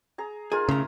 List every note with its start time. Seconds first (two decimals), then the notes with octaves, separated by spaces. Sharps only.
0.18 G#4 A#5
0.52 D#4 F4 G#4 A#4
0.69 A2 C#3 A#5